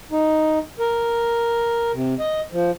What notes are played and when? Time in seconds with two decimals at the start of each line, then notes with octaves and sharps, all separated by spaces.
0.12 D#4
0.79 A#4
1.93 C3
2.19 D#5
2.52 F3